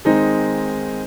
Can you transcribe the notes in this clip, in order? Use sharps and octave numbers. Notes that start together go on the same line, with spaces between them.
D#3 G#3 C4 D#4